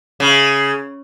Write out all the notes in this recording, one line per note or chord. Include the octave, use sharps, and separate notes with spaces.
C#3